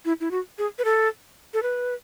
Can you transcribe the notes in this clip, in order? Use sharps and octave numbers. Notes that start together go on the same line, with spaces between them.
E4
E4
F#4
G#4
B4
A4
A4
B4